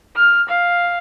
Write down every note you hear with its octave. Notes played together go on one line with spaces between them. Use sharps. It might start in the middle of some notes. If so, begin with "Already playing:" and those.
F6
F5